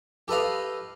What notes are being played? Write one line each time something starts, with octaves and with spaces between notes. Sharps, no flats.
G4 A4 B4 D#5 F5